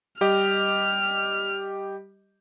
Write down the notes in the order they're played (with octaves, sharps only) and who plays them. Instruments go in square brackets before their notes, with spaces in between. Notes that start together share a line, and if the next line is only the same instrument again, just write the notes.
[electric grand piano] G3 G4 D#5 [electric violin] F6